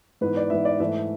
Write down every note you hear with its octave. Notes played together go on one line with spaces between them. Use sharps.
G#2 E3 B3 B4
D5
G#2 E3 B3 E5
D5
G#2 E3 A3 E5